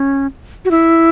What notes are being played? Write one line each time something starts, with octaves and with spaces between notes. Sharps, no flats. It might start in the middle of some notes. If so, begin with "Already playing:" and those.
Already playing: C#4
F#4
E4